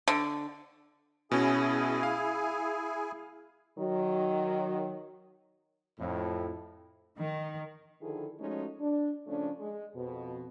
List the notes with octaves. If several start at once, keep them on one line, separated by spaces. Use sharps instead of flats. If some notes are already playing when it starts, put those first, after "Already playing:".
D3
B2 C#4 E4 G#4 G#5
F5
D#3 F#3
F2 A2
D#3
D3 D#3 F3 E4 G#4 A4
F3 G#3 A3 C#4 D#4 F#4
D4
C#3 F3 A3 C#4 D4
G#3
F2 B2